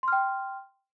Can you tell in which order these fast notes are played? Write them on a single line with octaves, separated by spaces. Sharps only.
C6 F6 G5